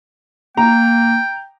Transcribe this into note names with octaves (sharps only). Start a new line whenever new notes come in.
A#3 G5 A#5